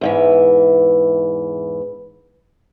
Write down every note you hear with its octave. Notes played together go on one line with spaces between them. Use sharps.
E2 G#2 E3